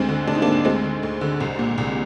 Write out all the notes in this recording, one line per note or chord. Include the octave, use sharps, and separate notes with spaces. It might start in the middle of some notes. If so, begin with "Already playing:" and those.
Already playing: D2 G#3 C4
D3
D2 D4
D#4
D3 A#3 D4
D2 G#3 C4
D3
D2
D3
C2
A#2
C2